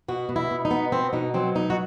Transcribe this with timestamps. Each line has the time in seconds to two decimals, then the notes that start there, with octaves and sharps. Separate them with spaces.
0.08 B2 F#4
0.29 B2
0.36 E4
0.51 B2
0.65 D#4
0.71 B3
0.92 B2 C4
1.13 B2 D#4
1.34 F#3 C4
1.55 B2 D#4
1.70 F#4